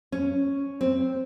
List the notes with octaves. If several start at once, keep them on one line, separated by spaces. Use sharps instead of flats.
C#4
C4